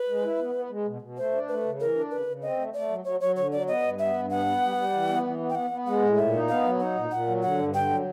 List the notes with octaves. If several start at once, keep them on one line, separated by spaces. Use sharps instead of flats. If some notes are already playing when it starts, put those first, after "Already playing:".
Already playing: B4
G#3
E4
B3
B3
G#3
B2
B2
A3 C5
D4
A3 B4
C#3
E3 A#4
D4
C#3 B4
C#3
C4 D#5
A3
A3 D5
F#3
F#3 C#5
F#3 C#5
D3 C#5
F#3 D5
B3 D#5
G2
B3 E5
G2
B3 F#5
B3
G3
G3
E3
B3
E3
B3
G5
B3 F#5
B3
G#3 F#5
A2
A#2 E5
D#4
B3 F5
F#3
D#4 F#5
A#2
A#2 F#5
F#3
D3 F#5
G2
D3 G5
F#3